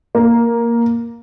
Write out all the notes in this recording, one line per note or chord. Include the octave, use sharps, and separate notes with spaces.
A#3